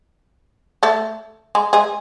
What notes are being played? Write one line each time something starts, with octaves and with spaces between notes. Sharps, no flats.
A3 A4
G#3 G#4
G#3 G#4